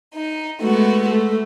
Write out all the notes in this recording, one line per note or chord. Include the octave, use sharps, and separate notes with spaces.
D#4
G#3 A3 B3 F#4
A3